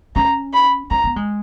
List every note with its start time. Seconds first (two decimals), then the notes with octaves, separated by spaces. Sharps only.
0.16 C#4 A#5
0.53 B5
0.90 C#4 A#5
1.04 B3
1.16 G#3